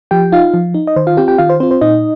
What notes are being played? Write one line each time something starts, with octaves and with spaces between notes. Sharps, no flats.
F3 G4 G5
D#4 F4 F5
F3
D#4
D#5
D#3 C5
F4 F5
C4 F4 G4 G5
G4 G5
D#3 F4 F5
C5
C4 F4 C5
C5
A#2 D#4 D#5